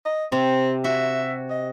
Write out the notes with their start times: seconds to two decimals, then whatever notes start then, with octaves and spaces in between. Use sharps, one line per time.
0.05 D#5
0.32 C3 C4
0.84 F#4 E5
1.50 D#5